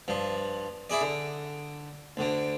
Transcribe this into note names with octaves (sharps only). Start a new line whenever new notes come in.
G2 F3
E4 G#4 D5
D3
D2 D3